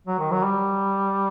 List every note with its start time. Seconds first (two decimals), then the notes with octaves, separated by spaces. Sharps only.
0.07 F#3
0.19 D#3
0.31 F#3
0.43 G3